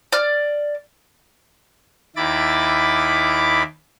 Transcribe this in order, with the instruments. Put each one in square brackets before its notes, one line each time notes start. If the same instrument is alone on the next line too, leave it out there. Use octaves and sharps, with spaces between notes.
[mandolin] D5 F6
[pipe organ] D#2 D#3 E4 B5 D6 A6